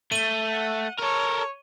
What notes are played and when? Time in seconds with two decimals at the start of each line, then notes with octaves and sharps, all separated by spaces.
0.12 A3 D#7 G7
0.52 F#5
0.99 A4 A#4 C#5